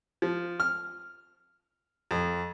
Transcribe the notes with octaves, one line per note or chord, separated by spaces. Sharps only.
F3
F6
F2